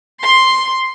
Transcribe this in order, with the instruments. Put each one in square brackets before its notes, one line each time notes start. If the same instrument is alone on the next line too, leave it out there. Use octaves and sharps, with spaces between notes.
[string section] C6